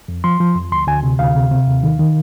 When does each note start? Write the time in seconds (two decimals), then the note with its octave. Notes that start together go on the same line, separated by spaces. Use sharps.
0.08 F2
0.24 F3 C6
0.40 F3
0.56 F2
0.72 D2 C6
0.87 D2 G#5
1.03 C3
1.19 D2 F5
1.35 C3
1.51 C3
1.67 D#2
1.83 D#3
1.99 D#3